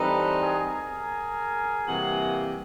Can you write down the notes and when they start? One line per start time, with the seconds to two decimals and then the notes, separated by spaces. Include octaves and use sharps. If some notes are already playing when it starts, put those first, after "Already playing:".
Already playing: E3 G3 C4 D#4 A4 B4
0.42 G#4 A#4
1.87 C3 E3 G3 A#3 F#4 G#4